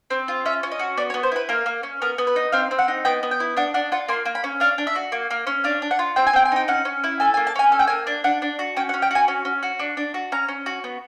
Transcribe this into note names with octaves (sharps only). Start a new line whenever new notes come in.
C4
F4
C#4 E5
C#4
D#5
F#4
B3 D5
C#5
B3
C5
E4 B4
A#3 A#4
A#3
C#4
B3 A#4
B3
B4
D#4
C4 F5
C4
F#5
D#4
B3 G5
B3
G5
E4
D4 F#5
D4 F#5
F4 F#5
A#3 C6
A#3
B5
C#4
D4 F5
D4
E5
F#4
A#3
A#3
C#4
D4 F5
D4
F#5
F4
C4 G5
G#5
C4 G5
G#5
D#4 G5
C#4 F#5
C#4
E4
A4 G#5
G#5
A#3
A5
C#4 G#5
A4 G#5
G5
A#3 G#5
D4
D4 F#5
D4
F#4
C#4 G5
F#5
C#4
G5
F#4 G#5
C#4
C#4
F#4
D4
D4
F#4
C#4 A#5
C#4
F#4
B3